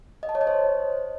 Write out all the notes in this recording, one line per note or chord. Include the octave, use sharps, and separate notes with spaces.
D#5
A5
C#5
D#5
C5